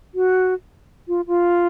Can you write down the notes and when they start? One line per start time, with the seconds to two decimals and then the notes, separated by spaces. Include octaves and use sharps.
0.14 F#4
1.08 F4
1.27 F4